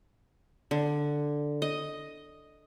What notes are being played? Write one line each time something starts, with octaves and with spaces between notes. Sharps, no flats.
D3
D#5